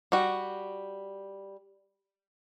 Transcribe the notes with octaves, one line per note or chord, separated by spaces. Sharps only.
G3 F#4